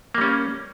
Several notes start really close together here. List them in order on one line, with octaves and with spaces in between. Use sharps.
A#3 G3 C#4